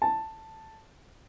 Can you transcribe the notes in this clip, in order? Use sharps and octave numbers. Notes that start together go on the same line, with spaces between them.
A5